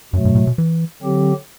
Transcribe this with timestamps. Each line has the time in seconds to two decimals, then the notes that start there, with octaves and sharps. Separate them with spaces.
0.13 F#2 B2 F#3 A3
0.25 G2
0.35 A2
0.47 B2
0.58 E3
1.02 D3 F#3 C4 G4